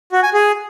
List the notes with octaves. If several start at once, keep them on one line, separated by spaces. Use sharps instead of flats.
F#4
G#5
G#4